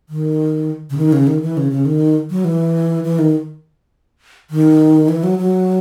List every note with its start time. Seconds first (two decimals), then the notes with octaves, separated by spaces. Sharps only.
0.09 D#3
0.90 C#3
0.98 D#3
1.13 C#3
1.27 D#3
1.42 E3
1.57 C#3
1.71 C#3
1.86 D#3
2.30 F#3
2.44 E3
3.04 E3
3.19 D#3
4.50 D#3
5.09 E3
5.24 F#3
5.39 F#3